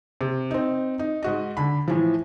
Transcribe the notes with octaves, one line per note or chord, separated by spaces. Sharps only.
C3
C4 D#4
D#4
G#2 F#4 D#5
D3 B5
A2 E3 F3